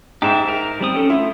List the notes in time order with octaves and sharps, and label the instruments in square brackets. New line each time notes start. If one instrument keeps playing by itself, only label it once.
[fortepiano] G#2 [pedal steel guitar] G4 E5
[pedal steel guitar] A#4
G3 C4 D#6
C#4 A4
[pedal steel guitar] A3 F4 [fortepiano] E4